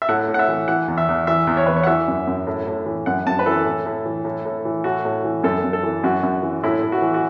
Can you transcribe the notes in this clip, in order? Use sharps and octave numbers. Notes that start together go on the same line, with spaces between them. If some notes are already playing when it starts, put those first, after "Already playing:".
E5
A2 F#5
A2
F#5
E5
E3
E3 F#5
E2
E5
E2
E3 E5
E2
C#5
E2 B4
C#5
F#5
E3 E5
F#2
F#2
A2
A2
E3
F#2 F#5
F#2 A5
B4
E3 A4
A2
A2
E3
A2
A2
E3
A2 F#4
A2
E3
F#2 A4
F#2
A4
E3
F#2 F#4
F#2
E3
A2 E4
A2
F#4
E3
F#4